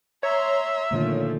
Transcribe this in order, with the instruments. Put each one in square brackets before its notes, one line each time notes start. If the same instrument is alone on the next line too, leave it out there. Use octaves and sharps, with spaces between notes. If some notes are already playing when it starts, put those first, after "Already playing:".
[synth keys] C#5 [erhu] E5 [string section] A#5 C6
[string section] A#2 F3 A3 [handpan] D3 D#3 A#3